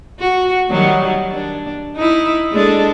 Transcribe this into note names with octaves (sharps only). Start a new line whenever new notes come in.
F#4
D#3 F#3 G3
D4
D#4 E4
G#3 D4 A4